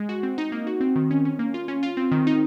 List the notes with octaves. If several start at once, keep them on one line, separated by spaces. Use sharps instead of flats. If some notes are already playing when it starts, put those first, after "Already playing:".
Already playing: G#3
F#4
C4
D#4
A#3
F#4
C4
D#3
C#4
C#4
A#3
F4
C#4
F4
C4
D#3
D#4